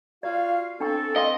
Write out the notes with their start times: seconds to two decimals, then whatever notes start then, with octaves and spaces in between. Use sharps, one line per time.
0.23 F4 F#4 D5 F5
0.80 C4 D4 A4 G5 C#6
1.16 D#5 F5 G5 C6